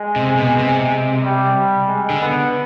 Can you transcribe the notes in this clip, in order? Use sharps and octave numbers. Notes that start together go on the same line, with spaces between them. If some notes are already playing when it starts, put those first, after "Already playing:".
Already playing: G#3
C3
B2
C3
G3
G#3
D3
B3